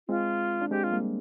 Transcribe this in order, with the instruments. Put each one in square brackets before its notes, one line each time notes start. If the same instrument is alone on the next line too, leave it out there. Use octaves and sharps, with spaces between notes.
[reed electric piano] G#3 C4 [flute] F4
[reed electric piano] D4
[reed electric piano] G#3 C4 [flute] G4
[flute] F4
[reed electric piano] G3 A#3